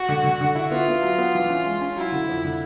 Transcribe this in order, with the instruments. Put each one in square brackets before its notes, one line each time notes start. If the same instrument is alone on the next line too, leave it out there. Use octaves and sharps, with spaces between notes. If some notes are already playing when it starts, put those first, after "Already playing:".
Already playing: [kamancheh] F#4
[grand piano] D3
D3
D3
E4
[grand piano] B3 [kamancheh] F4
[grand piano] B3
F#3
B3
E3
C#4
G#3
C#4
[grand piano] F#3 [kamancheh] E4
[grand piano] D3
F2
D3